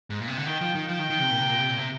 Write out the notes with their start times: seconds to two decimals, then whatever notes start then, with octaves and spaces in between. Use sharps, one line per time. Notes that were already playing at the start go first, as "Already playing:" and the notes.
0.10 G#2
0.20 A#2
0.28 C3
0.38 D3
0.46 D#3 G5
0.61 F3
0.75 D#3
0.88 F3 G5
0.99 D#3
1.10 D#3
1.20 C3
1.30 A#2
1.40 C3
1.49 A#2
1.59 C3
1.69 A#2
1.78 C3